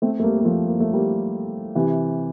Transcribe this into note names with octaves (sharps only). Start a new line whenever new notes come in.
A3 C4
A3
G3 A#3
A#3
F3 A3
A#3
A3
G3 A#3
C3 E3